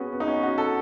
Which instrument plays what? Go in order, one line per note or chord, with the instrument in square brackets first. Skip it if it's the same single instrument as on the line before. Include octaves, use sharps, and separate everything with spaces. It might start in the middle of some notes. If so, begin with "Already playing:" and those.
Already playing: [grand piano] B3 C#4 F#4 G#4
B3
D#4
C#4
F#4
A4